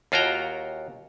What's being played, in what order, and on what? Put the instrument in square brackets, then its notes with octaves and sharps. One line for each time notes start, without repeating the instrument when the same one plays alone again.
[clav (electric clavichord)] D#2 F4 F#4 C#5 G5 A#5